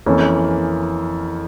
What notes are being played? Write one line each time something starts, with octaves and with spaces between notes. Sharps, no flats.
F2 E3 A#3 C#4